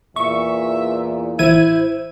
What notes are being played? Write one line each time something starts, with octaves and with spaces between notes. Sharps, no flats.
E2 A#2 E5 C#6
A1 E4 C5 G#6 D#7